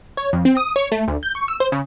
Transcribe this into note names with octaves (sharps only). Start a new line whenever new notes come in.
C#5
F2
C4
D#6
C#5
A3
D2
G6
C#6
E6
C5
C#3